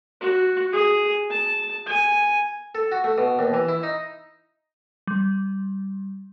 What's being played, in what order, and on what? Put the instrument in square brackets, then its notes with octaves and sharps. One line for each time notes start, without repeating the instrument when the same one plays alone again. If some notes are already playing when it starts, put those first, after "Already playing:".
[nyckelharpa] F#4
G#4
A5
G#5
[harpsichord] A4
F#4
A3
B2
D#2
E3
E4
D#4
[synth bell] G3